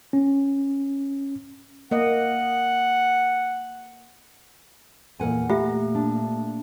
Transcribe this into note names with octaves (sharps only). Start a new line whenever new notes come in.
C#4
A#3 D#5 F#5
E2 A#2 A#4 F#5 G#5
A#2 A3 F4 G4 E5
D4